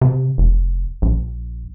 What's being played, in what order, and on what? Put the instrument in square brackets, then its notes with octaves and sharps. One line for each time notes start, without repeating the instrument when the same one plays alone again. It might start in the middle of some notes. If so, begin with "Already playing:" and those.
[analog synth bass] C3
F1
A#1